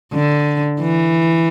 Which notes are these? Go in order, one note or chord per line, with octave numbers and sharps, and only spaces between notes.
D3
E3